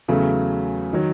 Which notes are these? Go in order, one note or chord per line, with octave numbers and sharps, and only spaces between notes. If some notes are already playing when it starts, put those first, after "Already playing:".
E2 C#3 F#3 A3
D#3 F#3